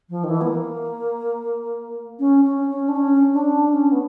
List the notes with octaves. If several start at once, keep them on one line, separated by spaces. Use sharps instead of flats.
F3
D#3
E3
B3
A#3
C#4
C#4
C#4
D4
C#4
D4
C#4
B3